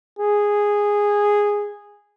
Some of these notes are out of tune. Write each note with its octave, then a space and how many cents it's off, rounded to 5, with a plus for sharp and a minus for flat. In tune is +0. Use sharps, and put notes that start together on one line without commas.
G#4 -10